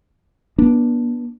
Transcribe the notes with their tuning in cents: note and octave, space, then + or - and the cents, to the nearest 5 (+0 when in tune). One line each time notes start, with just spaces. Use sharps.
B3 -40 D4 +0